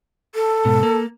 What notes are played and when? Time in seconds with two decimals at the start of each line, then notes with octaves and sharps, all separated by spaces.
0.35 A4
0.65 G#2 B2
0.83 A#3